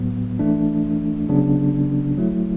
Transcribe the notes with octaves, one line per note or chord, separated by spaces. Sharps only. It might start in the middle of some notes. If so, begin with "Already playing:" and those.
Already playing: A2 F#3 B3
E3 A3 D4
C#3 F#3 B3 D4
F#3 A3 E4